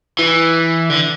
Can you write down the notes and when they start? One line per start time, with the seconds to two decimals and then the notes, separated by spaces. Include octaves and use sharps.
0.19 E3
0.90 D3